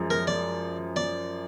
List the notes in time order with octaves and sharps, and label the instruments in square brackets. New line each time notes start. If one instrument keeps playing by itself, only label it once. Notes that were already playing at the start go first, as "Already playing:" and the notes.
Already playing: [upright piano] F#2 F3 G#3
[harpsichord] A#4
D5
D5